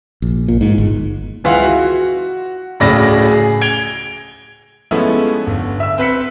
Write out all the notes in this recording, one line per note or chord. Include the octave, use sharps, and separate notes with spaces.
A#1
A#2
G#2
G1
C#2 E3 E4 F4 F5 F#5
F#4
D1 A2 C#3 D5 B5 A#6
G#4
G#6 D7 F7 G7
F3 G#3 A3 B3 C#4 E4
G1
E5 E6
C4 B4 B6 C#7